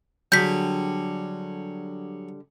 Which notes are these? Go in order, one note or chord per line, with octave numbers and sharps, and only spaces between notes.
D3 F#3 G3 G#4 G6 B6